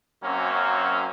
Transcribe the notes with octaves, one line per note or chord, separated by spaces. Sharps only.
F#2 F#3 A#3 C4 C#4